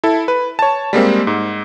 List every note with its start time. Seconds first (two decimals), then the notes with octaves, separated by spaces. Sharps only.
0.04 E4 A4
0.28 B4
0.59 C#5 A5
0.93 G3 G#3 A#3 C4
1.27 G#2